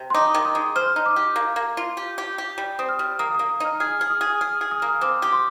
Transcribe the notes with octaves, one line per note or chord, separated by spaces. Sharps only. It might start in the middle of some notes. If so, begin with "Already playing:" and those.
Already playing: C3
C6
D#4 D6
D#3
D#6
G#3
C5 F6
D#4
D6
G4
A#3
A#3
F4
G4
G4
G4
G3
C4 D#6
F6
G3
A#3 D#6
A#3 D#6
D#6
D#4 F6
G#4 F6
G#4 F6
D#6
G#4
G#4 F6
G#4
D#6
A#3 F6
D#6
C4 D6
G4 D6
C6